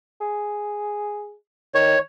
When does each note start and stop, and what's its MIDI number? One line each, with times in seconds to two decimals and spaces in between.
0.21 1.34 68
1.74 1.96 51
1.74 1.99 73